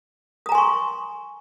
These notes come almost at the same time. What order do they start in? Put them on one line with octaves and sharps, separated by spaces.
D#6 A#5 G#5 C6 C#6